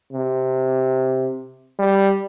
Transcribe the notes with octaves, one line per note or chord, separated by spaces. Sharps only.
C3
G3